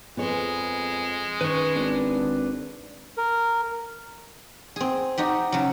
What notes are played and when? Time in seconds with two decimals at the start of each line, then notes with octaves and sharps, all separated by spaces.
0.17 F2 G#3 B3 G#4 C#5
1.41 D#3 C#4 B4 C#6
1.76 G#1 D4 B4
3.17 A#4
4.76 C4 G#4
5.18 D#4 F#4 G4
5.52 C#3 F#3